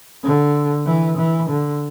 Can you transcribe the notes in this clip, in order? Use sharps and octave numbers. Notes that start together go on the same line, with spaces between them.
D3
E3
E3
D3